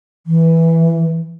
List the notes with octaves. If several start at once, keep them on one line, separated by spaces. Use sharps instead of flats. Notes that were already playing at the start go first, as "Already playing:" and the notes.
E3